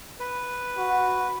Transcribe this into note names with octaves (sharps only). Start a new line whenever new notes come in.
B4
F#4